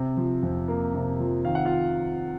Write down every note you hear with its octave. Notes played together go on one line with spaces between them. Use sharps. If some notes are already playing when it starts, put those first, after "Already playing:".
Already playing: C3
F3
F2
A#3
C3
F3
D#3 F5
F#5
F4 F5